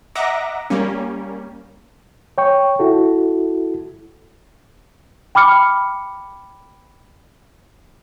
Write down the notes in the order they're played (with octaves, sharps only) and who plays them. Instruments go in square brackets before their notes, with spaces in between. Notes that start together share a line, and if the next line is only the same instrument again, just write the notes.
[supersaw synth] D#5 E5 F#5 A#5 D6 A#6
G3 A#3 C#4
[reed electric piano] C#5 G5 C#6
E4 F#4 A4
[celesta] G5 B5 D6 F6 C#7